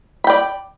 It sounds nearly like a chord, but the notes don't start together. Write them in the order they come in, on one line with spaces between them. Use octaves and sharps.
B5 G5 D5